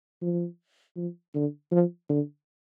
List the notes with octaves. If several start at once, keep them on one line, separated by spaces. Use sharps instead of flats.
F3
F3
D3
F3
D3